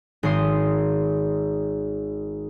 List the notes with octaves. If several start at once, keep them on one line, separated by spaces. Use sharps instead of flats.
G#1 D#3 G#3 C6 D#6